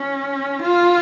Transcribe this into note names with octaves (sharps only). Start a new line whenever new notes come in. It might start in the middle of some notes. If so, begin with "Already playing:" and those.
Already playing: C#4
F4